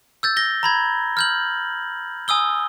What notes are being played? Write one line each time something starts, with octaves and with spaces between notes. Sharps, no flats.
E6 G6 A6
A#6 G7
A#5 B5 G#6
F6 G6 F#7
G#5 D#6 E6 G7